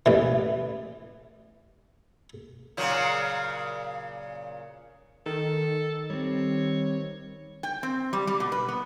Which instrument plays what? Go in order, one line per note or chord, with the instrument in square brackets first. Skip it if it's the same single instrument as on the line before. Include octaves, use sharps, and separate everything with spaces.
[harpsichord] A1 E3
[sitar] A#2 C#3 F#3
[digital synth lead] D#3 [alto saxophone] A4
[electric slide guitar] G3 C4 [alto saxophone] C#5
[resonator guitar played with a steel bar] G5
C4
G3
G3
B2
B4
B3